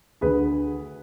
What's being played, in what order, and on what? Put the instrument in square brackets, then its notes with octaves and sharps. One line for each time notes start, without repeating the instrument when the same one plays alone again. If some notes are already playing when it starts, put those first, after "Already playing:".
[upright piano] D2 D3 G#4 B4